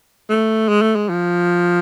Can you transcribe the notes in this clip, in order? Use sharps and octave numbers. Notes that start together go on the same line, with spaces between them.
A3
G#3
A3
G#3
F3